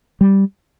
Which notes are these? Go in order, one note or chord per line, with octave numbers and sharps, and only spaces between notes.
G3